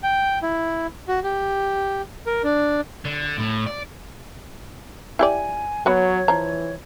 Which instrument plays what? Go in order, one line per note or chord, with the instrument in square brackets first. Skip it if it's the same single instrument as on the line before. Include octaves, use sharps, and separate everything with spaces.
[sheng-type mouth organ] G5
E4
F#4
G4
A#4
D4
[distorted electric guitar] D3
A2
D5
[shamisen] E4 G4 D5 [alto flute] G#5
[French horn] F#3 [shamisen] B3 F#4 B5 [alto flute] C#5
[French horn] E3 [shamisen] F3 A#5